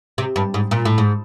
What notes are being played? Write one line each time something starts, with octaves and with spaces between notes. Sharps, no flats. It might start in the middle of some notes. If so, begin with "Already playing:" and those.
C3
G2
G#2
A#2
A2
G#2